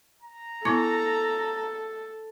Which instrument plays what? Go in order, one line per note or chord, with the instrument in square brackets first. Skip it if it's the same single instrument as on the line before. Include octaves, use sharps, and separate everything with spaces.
[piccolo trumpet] A#5
[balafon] B3 E4 C#6 [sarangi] A4